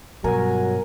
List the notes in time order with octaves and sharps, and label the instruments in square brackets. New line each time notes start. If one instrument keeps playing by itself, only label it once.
[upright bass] G2 B2 [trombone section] F#3 [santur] A#4 D#5 G#5